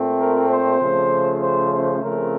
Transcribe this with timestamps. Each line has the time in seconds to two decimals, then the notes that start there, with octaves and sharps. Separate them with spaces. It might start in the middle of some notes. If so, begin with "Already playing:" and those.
Already playing: A#2 A3 C4
0.19 A#4
0.50 C5
0.80 C#3 F3 A3
1.41 C5
1.71 C5
2.02 C#3 F3 A3 C4 A#4